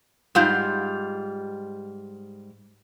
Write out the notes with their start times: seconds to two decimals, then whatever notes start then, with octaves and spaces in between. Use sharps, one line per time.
0.35 G#2 G3 F4